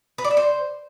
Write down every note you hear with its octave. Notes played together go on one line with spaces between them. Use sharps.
B4
D5
E5
C5